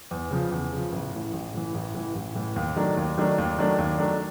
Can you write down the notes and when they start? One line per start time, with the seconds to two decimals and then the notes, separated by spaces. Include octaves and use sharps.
0.11 E2
0.31 C#3 F3
0.51 E2
0.72 C#3 F3
0.92 A1
1.13 A2 E3
1.33 A1
1.54 A2 E3
1.74 A1
1.94 A2 E3
2.15 A1
2.35 A2 E3
2.56 D#2
2.76 D#3 F#3 A3 D4
2.97 D#2
3.18 D#3 F#3 A3 D4
3.38 D#2
3.58 D#3 F#3 A3 D4
3.78 D#2
3.99 D#3 F#3 A3 D4